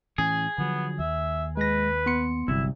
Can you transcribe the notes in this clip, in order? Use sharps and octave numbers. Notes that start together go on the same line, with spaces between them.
A2 E3 C#4 G#4
D3 F3 F#3 B3
D#2 E5
G#3 B4 A#6
B3 C6 C#7
G1 C2 F#3 E4